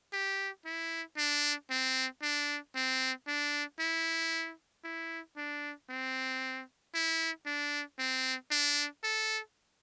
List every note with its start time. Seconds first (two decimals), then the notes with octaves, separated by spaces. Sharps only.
0.13 G4
0.65 E4
1.17 D4
1.70 C4
2.22 D4
2.75 C4
3.27 D4
3.80 E4
4.84 E4
5.37 D4
5.89 C4
6.94 E4
7.46 D4
7.99 C4
8.51 D4
9.04 A4